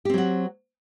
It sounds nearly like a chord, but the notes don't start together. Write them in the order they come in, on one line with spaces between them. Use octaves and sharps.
G4 C4 F#3 F#4